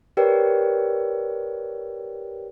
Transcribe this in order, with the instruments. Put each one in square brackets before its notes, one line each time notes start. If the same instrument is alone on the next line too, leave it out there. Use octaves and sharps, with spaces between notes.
[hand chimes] G4 A#4 B4 C#5 D5 G5